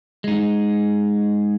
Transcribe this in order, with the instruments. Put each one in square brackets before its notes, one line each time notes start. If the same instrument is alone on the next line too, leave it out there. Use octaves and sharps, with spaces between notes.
[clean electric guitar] G#3 D#4